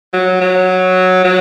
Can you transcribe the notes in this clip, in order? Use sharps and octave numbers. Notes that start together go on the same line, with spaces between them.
F#3
F#3
F#3